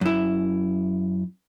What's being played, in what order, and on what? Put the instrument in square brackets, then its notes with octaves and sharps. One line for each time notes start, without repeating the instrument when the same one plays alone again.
[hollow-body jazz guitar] F#2 E4